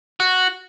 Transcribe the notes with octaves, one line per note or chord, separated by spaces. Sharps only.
F#4